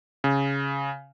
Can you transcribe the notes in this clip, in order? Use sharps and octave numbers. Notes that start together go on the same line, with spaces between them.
C#3